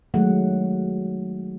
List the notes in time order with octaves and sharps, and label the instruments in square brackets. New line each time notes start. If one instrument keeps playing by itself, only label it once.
[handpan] D#3 F#3 G#3 A3 F#5